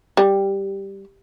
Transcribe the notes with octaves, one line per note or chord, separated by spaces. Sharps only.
G3